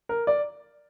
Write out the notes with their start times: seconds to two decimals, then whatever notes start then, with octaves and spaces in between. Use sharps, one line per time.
0.09 A#4
0.27 D5